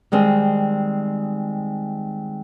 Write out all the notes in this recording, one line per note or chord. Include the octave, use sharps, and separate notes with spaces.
D#3 G3 G#3 C4